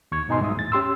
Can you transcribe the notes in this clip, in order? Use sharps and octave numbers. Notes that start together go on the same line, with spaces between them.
D#2 C#6 G#6
G#2 B2 D#4 G#5 C6
C2 G#2 F#3 E5 D#6
E2 A2 A6
C#4 G4 C6 E6